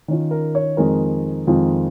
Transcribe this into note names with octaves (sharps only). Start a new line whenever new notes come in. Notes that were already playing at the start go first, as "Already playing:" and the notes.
D#3 C#4 F4
A#4
C#5
F2 D#3 G#3 A#4
F2 D#3 G#3 F4